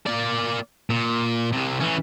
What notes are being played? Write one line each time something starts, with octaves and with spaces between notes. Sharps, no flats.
A#3 D5
A#2
C2 C3
E3 C#4